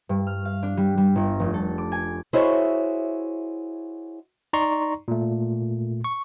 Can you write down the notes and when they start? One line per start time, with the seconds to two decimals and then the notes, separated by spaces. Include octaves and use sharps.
0.09 G2
0.27 F6
0.45 F5
0.63 D4
0.77 G3
0.98 G3
1.16 G1
1.40 F1
1.54 A4
1.78 D6
1.92 G#5
2.33 E4 F#4 G#4 C5 C#5 D#5
4.53 D#4 D5 A#5 C6 C#6
5.08 A#2 A3
6.04 C#6